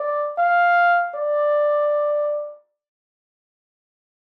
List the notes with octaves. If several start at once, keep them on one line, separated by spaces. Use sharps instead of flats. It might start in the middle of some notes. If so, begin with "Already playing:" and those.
Already playing: D5
F5
D5